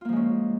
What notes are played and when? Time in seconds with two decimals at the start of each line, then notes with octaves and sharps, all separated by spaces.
0.01 F4
0.05 A#3
0.09 F3
0.12 G#3
0.16 C#4